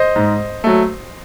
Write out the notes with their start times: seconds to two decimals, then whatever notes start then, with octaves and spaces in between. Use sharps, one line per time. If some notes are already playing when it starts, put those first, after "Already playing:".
Already playing: C5 D#5
0.16 G#2
0.64 F#3 A3